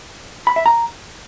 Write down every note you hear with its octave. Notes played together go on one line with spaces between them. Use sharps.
B5
E5
A#5